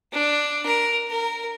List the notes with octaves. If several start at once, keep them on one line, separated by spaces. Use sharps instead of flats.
D4
A#4
A#4